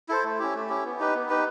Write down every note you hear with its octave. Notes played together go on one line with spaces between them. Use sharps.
E4 A4 C5
A3
C#4 E4 G4
A3
C#4 E4 G4
B3
D#4 G4 B4
B3
D#4 G4 B4